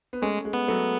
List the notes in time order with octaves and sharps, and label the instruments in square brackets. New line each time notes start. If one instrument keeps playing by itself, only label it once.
[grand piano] B3
[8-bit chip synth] G#3 [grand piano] A3 C#4
[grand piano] G#3
[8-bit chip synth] B3
[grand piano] F#3 A3